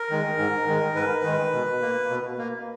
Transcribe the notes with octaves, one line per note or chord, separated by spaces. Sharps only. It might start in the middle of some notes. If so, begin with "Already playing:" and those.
Already playing: A#4
D#3 G#3
G#2
D#3 G#3
G#2 B4
D#3 G#3
B2
A#3
B2
A#3